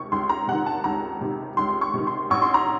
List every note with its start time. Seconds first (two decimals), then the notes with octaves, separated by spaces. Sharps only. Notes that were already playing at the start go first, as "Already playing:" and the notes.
Already playing: C#2 C3 D#3 C#6
0.12 C#2 C6
0.29 A#5
0.48 C3 D#3 F#5
0.66 A5
0.84 C#2 A#5
1.21 C3 D#3
1.57 C#2 C6
1.81 C#6
1.94 C3 D#3
2.07 C6
2.30 A1 C#6
2.42 C6
2.54 A#5